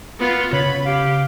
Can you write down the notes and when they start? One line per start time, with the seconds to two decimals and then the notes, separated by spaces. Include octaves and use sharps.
0.19 B3 F4
0.53 C#3 C#5 B5
0.85 G4 F5